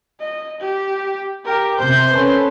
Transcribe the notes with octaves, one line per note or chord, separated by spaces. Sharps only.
D#5
G4
G4 A#4
C3 C5 G6
C#4 A4 B4